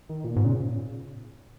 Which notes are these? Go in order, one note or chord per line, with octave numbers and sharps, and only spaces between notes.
D#3
A#2
G#2 B2
A#2 C#3